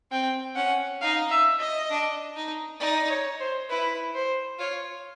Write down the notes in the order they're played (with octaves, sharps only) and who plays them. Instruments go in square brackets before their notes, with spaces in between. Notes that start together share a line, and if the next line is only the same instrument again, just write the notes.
[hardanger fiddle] C4 [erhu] G5
[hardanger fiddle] C#4 [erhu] F#5
[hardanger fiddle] D#4 [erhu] F5
[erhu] E5
D#5
[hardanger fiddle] D4
D#4
[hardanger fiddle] D#4 [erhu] D5
[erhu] C#5
C5
[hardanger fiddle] E4 [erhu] B4
[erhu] C5
[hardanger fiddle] F4 [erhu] C#5